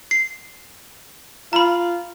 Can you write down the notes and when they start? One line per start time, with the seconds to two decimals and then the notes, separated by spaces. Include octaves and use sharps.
0.11 C7
1.53 F4 A#5 B5